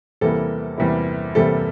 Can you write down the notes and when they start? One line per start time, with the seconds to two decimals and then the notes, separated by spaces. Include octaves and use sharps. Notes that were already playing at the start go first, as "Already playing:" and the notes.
0.21 E2 C3 G3 A#3 E4 A4
0.78 E2 C3 G3 A#3 E4
1.35 E2 C3 G3 A#3 E4 A4